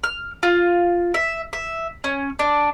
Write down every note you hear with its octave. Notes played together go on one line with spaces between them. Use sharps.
F6
F4
E5
E5
C#4
D4